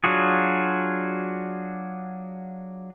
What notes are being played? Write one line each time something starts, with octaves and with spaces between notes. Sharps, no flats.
F#3 D4 F4 F#4 G#4